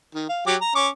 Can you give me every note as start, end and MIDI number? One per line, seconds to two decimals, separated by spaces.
0.15 0.26 51
0.29 0.42 77
0.47 0.55 54
0.47 0.55 67
0.47 0.55 86
0.61 0.73 82
0.75 0.88 61
0.75 0.88 85
0.75 0.88 86